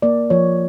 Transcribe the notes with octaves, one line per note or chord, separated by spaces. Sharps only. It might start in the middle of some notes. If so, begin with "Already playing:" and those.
A#3 D5
F3 C#5